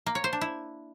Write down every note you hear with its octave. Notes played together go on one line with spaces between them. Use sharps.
A#3
C#5
C5
D4
E4